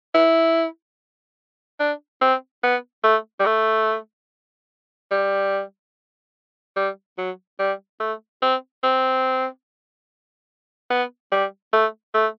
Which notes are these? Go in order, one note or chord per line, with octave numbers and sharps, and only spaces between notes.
E4
D4
C4
B3
A3
G3
A3
G3
G3
F#3
G3
A3
C4
C4
B3
G3
A3
A3